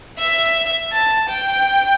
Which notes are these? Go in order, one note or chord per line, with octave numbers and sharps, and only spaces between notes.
E5
A5
G5